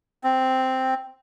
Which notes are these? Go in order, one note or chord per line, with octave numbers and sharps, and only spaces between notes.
C4